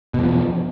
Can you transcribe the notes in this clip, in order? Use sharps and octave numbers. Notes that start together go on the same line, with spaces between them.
E2 B2 F3